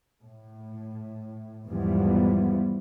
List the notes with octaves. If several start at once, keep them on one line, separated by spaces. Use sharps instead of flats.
A2
E2 G#2 E3 F3 G3 B3